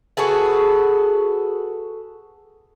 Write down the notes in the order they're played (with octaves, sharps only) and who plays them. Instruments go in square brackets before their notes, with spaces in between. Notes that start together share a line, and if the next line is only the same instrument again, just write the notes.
[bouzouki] F#4 G#4 A4 B4